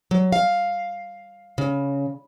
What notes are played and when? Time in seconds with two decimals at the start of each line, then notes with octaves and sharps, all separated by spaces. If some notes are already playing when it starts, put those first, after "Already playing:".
0.11 F#3
0.32 F5
1.58 C#3